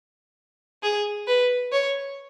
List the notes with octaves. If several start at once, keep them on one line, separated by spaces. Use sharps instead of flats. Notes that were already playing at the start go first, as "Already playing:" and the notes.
G#4
B4
C#5